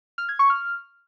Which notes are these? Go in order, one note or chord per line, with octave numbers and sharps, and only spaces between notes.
F6
G#6
C#6
F6